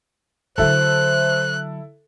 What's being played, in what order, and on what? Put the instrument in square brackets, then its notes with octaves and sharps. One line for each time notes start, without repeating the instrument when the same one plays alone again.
[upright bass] D3 F#3 [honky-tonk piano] E4 A4 [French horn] C5 [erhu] F#6